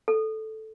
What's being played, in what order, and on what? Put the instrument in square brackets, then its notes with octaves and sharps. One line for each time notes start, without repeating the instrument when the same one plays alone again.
[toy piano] A4